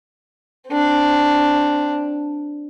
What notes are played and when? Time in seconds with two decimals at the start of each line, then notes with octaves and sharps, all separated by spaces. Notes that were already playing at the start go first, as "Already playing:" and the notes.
0.71 C4 D4